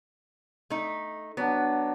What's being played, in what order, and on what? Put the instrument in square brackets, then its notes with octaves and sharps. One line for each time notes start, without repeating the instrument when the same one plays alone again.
[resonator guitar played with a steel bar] A3 D#4
[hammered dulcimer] F#3 D4 [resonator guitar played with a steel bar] B3